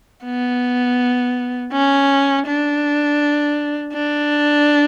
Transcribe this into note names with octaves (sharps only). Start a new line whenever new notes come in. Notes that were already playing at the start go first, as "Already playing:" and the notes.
B3
C#4
D4
D4